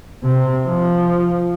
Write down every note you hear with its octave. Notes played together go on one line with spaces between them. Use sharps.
C3
F3